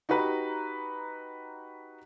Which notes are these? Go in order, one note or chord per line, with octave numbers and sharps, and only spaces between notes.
D#4 F#4 G4 B4 A#5